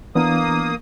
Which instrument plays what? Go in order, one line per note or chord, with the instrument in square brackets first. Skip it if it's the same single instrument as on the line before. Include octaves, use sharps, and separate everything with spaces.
[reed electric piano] E3 B3 D4 [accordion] A#3 D#6